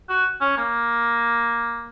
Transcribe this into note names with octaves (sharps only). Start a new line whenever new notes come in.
F#4
C#4
A#3